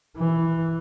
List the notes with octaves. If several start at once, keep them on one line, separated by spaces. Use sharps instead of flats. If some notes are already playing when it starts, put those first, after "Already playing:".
E3